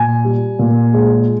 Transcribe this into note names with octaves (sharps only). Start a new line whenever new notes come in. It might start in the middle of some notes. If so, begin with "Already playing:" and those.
Already playing: A#2 G#5
G3
A#2
G#3